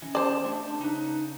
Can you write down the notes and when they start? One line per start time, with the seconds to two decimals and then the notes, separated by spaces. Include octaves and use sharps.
0.02 E3 C#4
0.15 C5 D5 A5
0.45 A3 D4
0.81 C#3 D#4 B4